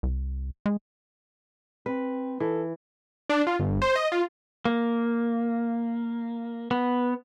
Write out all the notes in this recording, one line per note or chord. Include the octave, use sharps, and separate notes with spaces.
C2
G#3
C4 B4
E3 A4
D4
F4
G1
C5
D#5
F4
A#3
B3